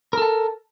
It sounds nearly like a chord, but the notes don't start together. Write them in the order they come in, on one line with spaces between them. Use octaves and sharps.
A#4 A4 A5